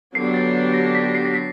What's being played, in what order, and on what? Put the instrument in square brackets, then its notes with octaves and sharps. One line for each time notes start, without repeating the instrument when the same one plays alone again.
[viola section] D3 F#3 B3 D4 G4 [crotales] C7
[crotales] A6
A#6
B6
C7
A#6
B6